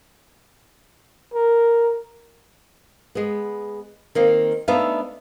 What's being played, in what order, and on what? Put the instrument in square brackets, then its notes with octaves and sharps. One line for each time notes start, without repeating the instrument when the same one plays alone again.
[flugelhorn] A#4
[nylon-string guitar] G#3 B3
D#3 A#3 C4
A3 B3 D4 D#4 E5 F5